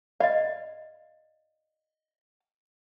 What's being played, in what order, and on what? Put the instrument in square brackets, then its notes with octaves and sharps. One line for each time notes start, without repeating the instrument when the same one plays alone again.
[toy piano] D5 D#5 [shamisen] F5